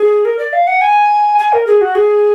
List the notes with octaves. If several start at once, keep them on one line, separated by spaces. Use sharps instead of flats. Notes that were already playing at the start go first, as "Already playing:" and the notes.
Already playing: G#4
A#4
D5
F5
F#5
G#5
G#5
A#4
G#4
F#4
G#4